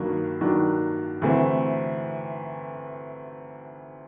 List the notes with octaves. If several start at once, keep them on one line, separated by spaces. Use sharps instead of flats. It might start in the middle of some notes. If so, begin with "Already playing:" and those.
Already playing: G2 D#3 F#3 A#3 D4
G2 D#3 F#3 A#3 D4
D2 C3 E3 A3 C4